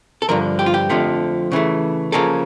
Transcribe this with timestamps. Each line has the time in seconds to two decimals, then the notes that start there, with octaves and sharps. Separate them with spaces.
0.22 A4
0.29 G2 D3 F3 A#4
0.59 G4
0.66 F4
0.74 G4
0.90 F2 D3 F3 A3
1.52 C#3 E3 A3
2.12 C#3 F3 A#3 C#4 A4